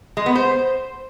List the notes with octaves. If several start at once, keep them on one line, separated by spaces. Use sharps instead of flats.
G#3
B3
C5